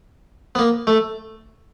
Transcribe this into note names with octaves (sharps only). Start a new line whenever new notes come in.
B3
A#3
A3